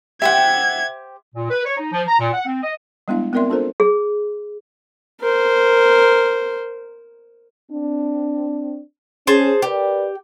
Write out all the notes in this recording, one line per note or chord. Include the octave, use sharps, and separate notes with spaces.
G4 C5 E5 F#5 G5 G#6
A#2
B4
C#5
D#4
F3
A#5
A#2
F#5
C4
D#5
G3 G#3 B3 D4 E4 F5
B3 C4 A#4 D5 E5 C6
D4 F4 A4 A#4 C5 A#5
G#4
A#4 C5
C4 D4
C#4 G#4 C5 A5
G4 A#4 B4 D5